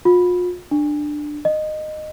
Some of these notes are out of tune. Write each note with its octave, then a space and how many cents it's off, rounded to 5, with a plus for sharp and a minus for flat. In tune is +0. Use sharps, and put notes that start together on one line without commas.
F4 +40
D4 +15
D#5 -15